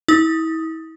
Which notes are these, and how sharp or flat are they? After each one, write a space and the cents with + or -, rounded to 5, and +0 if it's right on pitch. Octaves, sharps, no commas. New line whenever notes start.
E4 -35 D#6 +5